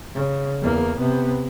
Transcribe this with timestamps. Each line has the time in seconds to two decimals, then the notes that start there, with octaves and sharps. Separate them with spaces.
0.14 C#3
0.61 E2 A#3
0.99 C3 B3